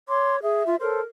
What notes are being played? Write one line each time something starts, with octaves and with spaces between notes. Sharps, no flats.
C#5 C6 D6
G#4 E5
F4
A4 A#4 C5 C#5